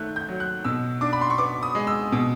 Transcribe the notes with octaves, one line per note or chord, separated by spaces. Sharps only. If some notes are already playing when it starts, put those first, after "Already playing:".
Already playing: D#3 A3 F#6 G6
G6
F#3
F#6
B2 E6
D4 D6
B5
C6
C#6
B3 D6
D#6
G#3
E6
B2